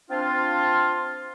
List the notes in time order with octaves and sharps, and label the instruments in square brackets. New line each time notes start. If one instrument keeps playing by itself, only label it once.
[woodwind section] C4 D4 F4